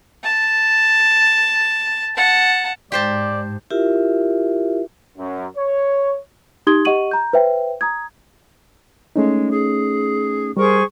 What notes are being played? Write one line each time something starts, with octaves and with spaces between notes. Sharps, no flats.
A5
F#5 A5
G#2 G4 C5 D5 A5
E4 F4 G4 A#4 E5
F#2
C#5
D#4 G4 C6 D#6 G#6 G7
G4 D#5 F#5 C#6 D#7 F#7
A#5 G6
B4 C5 E5 G5
A#5 D#6 G#6
G#3 A3 C#4 D#4
G#4
G3 G#4 A#4 C5 C#6